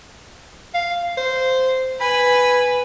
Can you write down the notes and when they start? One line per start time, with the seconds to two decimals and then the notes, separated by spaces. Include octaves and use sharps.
0.74 F5
1.17 C5
2.01 B4 G#5 B5